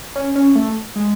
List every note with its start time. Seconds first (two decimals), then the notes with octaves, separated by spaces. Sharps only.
0.15 C#4
0.35 C#4
0.55 A3
0.96 G#3